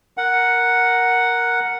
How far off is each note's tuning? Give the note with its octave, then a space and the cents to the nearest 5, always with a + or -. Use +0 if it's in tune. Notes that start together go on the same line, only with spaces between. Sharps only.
A#4 +0 F#5 +0